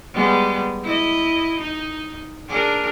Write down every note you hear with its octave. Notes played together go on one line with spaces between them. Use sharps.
G3 G#3 B3
E4 D#5
D#4
D4 G#4 A#4